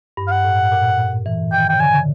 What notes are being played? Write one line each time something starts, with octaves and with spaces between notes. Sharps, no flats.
G2
F5
F#5
A2
A#2
E3
D#3 G5
C#3 G5
D3 G#5